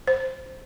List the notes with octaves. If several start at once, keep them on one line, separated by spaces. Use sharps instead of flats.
C5